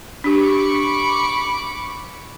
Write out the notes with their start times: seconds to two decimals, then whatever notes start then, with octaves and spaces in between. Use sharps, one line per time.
0.24 D4 G4 B5 C#6 D6